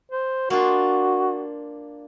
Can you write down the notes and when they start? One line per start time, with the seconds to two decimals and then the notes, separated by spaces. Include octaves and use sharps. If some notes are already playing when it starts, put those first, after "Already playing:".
0.12 C5
0.50 A#3 D4 F4 F#4